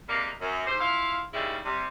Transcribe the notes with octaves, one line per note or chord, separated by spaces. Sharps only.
C3 G3 G#3 A#3
F#2
G#2 G4 C5
E4 F4 F5
D#2 C#3 G3 G#3 E4
C3 G3